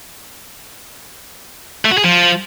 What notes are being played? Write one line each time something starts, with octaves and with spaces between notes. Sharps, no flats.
A3
F#4
G#4
F3